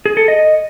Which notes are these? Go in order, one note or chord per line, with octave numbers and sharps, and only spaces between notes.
G#4
A4
D#5